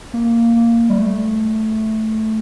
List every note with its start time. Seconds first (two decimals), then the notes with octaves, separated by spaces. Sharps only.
0.14 A#3
0.56 A#3
0.89 G3
0.98 A3